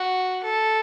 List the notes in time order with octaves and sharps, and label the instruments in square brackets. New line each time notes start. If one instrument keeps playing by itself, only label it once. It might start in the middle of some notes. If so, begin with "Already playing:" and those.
Already playing: [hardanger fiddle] F#4
A4